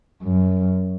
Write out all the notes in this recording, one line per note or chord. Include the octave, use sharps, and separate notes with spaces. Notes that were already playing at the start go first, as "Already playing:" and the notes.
F#2